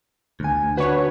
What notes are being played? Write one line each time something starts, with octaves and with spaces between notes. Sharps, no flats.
D2 G#5
D4 F#4 B4 C#5